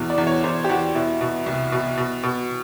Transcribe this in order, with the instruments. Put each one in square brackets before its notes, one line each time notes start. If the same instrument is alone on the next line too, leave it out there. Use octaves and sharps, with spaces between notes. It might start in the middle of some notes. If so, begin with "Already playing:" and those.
Already playing: [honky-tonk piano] E2 B2
D5
E2
C#5
E2 C5
G4
E2 F#4
B2 E4
B2
C2
B2
B2
B2